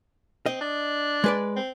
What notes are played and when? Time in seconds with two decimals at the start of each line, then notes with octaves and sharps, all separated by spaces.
0.46 C4 D#5
0.61 D4
1.24 G#3 B4 D5
1.56 C4